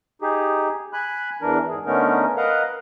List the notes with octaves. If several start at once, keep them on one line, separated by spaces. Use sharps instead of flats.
D#4 G4 G#4
G#5 B5 F#6
E2 E3 D4 A#4
G#2 G#4
D3 A3 B3 C#4 D#4 A#4
A#4 B4 D#5 F5 F#5 A#5